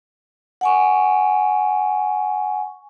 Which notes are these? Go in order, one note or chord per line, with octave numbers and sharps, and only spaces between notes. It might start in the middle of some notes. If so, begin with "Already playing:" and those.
F#5 G#5 C#6